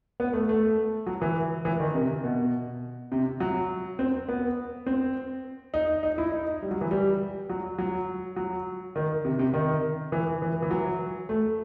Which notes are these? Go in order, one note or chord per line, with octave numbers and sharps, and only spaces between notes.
B3
A3
A3
F#3
E3
E3
D#3
C3
B2
C3
F#3
C4
B3
C4
D#4
D#4
E4
D#4
G3
F#3
E3
G3
F#3
F#3
F#3
D#3
C3
C3
D#3
E3
E3
E3
F#3
A3